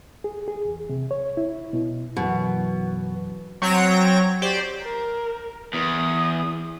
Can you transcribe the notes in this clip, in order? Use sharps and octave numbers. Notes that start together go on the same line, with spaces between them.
G#4
G#4
E2
C3
C#5
E4
B2
F#2 B2 E3
F#3 C4 C#5 G6 A#6 D7
G4 C5 D5
A#4
E2 D#6